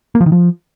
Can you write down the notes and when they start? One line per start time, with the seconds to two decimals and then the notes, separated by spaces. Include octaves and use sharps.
0.15 A#3
0.21 F3
0.26 D#3
0.32 F3